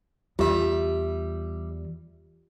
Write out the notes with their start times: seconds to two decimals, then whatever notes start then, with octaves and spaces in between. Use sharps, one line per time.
0.39 E2 G3 F4 G4 E5